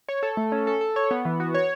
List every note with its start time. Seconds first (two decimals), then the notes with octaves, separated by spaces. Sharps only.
0.09 C#5
0.23 A4
0.37 A3
0.52 C#4
0.67 A4
0.81 A4
0.96 C#5
1.11 B3
1.25 E3
1.40 F#4
1.54 C#5